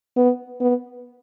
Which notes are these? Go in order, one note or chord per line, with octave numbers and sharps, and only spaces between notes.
B3
B3